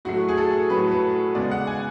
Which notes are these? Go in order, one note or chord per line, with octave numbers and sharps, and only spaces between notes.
A2 F#3 A3 F#4
G#4
A4
A2 F#3 A3 B4
B4
C#3 G#3 B3 D5
F#5
G#5